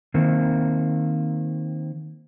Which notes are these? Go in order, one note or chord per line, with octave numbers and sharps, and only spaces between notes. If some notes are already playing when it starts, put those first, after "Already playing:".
D#3 A#3 C4